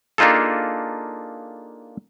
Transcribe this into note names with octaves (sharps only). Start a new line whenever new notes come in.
A#3 D4 D#4 F4 G#4 A4